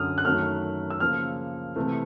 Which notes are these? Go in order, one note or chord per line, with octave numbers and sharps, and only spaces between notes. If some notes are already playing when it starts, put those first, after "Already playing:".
Already playing: F#2 D3 F#3 D#6 F6
F#6
F#2 D#3 F#3 A3 F6
E6
C#3 F3 A#3 F6
C3 E3 A3